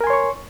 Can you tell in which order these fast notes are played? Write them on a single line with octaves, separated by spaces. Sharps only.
A#4 G#5 C6 C#5 C#6